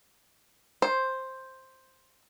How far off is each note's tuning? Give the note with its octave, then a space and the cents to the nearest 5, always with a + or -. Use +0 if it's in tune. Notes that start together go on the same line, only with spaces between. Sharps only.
C5 +5